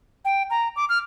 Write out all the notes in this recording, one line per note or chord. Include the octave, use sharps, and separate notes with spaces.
G5
A#5
D6
F6